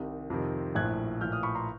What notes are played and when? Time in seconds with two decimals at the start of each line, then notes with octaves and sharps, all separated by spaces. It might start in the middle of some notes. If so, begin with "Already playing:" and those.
Already playing: C2 C3 D#3 G3
0.30 F2 C3 D#3
0.75 A#1 A2 F3 F#6 G#6
1.21 A#1 A2 F3 F6 G6
1.32 D#6 F6
1.43 B5 C#6
1.55 A#5 C6